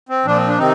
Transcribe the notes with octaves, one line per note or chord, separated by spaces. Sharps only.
C4
A#2 F3 D4
C4
D4
C3 D#3 C4 D#4